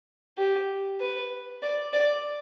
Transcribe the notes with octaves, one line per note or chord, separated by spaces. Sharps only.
G4
B4
D5
D5